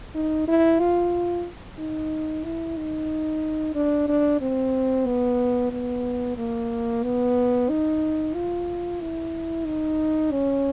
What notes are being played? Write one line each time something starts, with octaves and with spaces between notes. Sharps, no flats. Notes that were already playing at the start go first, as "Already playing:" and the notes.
D#4
E4
F4
D#4
E4
D#4
D4
D4
C4
B3
B3
A#3
B3
D#4
F4
E4
D#4
C#4